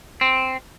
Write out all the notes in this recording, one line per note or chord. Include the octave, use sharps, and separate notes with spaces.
C4